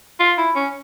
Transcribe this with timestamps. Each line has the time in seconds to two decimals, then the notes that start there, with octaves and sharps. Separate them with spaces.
0.20 F4
0.37 E4
0.56 C#4